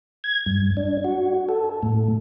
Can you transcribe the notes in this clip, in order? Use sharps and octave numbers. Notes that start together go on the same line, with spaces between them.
G#6
G2
D4
F#4
A4
A2